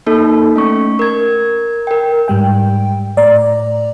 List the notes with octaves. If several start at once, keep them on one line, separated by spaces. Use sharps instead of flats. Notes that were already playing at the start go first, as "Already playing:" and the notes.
A#3 D#4 A4
A3 C#4 C#6
A#4 G#6
A#4 G5
G#2 G3 G5
A2 D5 A#5